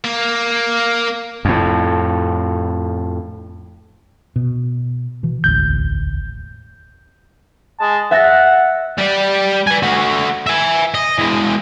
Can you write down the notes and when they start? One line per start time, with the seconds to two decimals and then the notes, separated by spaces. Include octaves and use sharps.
0.04 A#3
1.45 F2 A2
4.36 B2
5.23 B2 E3
5.44 E1 A1 D2 G6
7.80 G#3 A5
8.11 E5 F#5 A6 A#6
8.98 G3 D5
9.67 B4 G#5
9.83 A3 F#4
10.47 E5 G#5
10.95 D#5
11.19 E3 G#3